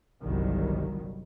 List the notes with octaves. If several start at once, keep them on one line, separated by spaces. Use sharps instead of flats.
G1 C2 D#3 F#3 G3